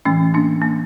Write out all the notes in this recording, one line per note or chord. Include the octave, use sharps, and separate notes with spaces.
A2 E3 A3 C#4
A#3 D4
A#3